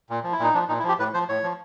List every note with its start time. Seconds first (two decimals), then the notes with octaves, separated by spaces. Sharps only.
0.10 A#2
0.24 F3
0.32 E4
0.39 A#2 D#4
0.54 F3 D4
0.68 A#2 D#4
0.79 E4
0.84 F3 G4
0.99 A2 B4
1.14 F3 C5
1.28 A2 C#5
1.43 F3